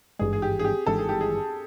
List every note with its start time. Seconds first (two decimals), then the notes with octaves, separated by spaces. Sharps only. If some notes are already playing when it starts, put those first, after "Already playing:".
0.19 G#1 G2 E3 G#3 G#4
0.33 G#4
0.42 G4
0.59 G#4
0.64 G4
0.86 G#1 G2 E3 G#3 A4
0.98 G#4
1.09 G4
1.21 G#4